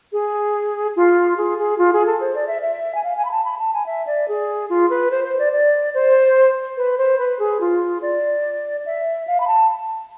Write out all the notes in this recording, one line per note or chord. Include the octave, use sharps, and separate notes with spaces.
G#4
F4
G#4
G#4
F4
G#4
A4
C5
D5
E5
E5
G#5
F5
G#5
B5
A5
B5
A5
G#5
E5
D5
G#4
F4
B4
C5
C5
D5
D5
C5
B4
C5
B4
G#4
F4
D5
E5
F5
B5
A5